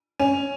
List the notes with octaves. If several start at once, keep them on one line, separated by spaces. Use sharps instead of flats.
C#4